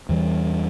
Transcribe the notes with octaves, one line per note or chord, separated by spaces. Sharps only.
E2 E3 G3